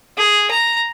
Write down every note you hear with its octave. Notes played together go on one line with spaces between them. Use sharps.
G#4
A#5